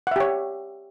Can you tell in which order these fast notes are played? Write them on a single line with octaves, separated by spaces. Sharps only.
F#5 E5 G4 C#5